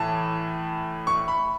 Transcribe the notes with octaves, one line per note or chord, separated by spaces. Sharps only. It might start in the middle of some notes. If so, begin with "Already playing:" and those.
Already playing: A2 E3 A5
C#6
B5